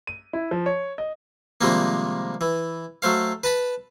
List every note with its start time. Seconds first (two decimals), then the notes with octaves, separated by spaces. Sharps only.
0.07 D#7
0.33 E4
0.51 F3
0.66 C#5
0.98 D#5
1.61 C3 D#3 F3 G3 G#3 A#3
2.41 E3
3.02 F#3 A3 C5 F5
3.44 B4 A5 B5